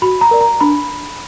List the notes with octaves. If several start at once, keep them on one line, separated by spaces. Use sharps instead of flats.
F#4 B5
A#5
A#4 D5
A#5
D4 B5